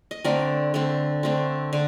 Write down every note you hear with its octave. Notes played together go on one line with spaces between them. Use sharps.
D#5
D3 A3 C4 A#4 D5
D3 A3 C4
D3 A3 C4
D3